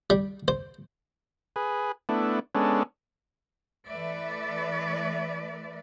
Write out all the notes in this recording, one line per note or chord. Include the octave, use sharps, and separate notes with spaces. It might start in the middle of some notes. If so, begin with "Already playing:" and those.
G3
C5
G#4 B4
A3 B3 D4 E4
G#3 B3 C#4 D4 A4
E3 A3 B4 D5 E5